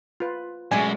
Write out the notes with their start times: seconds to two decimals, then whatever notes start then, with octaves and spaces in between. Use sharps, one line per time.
0.20 F4 B4
0.71 F#2 B2 G#3 A3 D5 G#5